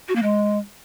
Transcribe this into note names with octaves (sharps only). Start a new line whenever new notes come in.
F#4
A#3
G#3